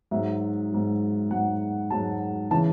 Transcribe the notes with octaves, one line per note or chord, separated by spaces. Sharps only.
G#2 F#3 E5
G#2 F#3
G#2 F#3 F#5
G#2 F#3 A5
C#3 E3 A5